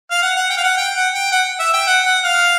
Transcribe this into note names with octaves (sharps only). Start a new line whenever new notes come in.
F5
F#5
F#5
G5
F5
F#5
G5
F#5
G5
F#5
E5
G5
F#5
F#5
F5